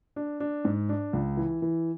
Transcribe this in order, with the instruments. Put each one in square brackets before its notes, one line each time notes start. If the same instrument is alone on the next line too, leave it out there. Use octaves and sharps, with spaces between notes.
[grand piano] D4
D4
G#2
D4
C#2
E3
E3